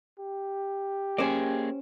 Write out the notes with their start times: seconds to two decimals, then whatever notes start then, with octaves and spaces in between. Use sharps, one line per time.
0.19 G4
1.18 A#3 C#4 G#4 C5 D5